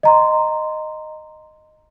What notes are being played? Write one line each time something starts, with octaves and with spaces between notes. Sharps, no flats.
D#5 A#5 C6